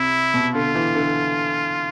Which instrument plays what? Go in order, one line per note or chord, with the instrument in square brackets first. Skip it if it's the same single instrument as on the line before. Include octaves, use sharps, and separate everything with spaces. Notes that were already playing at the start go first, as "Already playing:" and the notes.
Already playing: [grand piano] C3 [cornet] E4
[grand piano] B2
[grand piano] D3 [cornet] F4
[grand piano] E3
D3